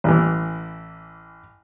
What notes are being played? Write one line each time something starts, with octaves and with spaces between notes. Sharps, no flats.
A1 E3